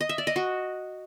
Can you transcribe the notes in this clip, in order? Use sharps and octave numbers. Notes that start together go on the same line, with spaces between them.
D#5
E5
D5
D#5
F#4